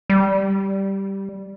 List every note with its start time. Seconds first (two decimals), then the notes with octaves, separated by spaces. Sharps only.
0.10 G3